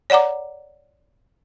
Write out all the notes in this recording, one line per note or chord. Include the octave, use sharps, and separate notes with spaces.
C#5 D5 F#5 A#5 D6